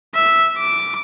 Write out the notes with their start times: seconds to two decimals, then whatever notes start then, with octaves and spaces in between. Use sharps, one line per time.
0.15 E5
0.57 D6